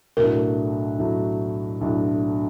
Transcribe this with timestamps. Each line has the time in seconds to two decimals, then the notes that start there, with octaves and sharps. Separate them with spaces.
0.17 B1 A2 F#3 A3 D4 A#4
0.99 B1 A2 F#3 A3 D4
1.81 B1 A2 F#3 A3 D4